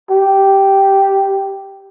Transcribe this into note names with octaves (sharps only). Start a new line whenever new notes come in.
G4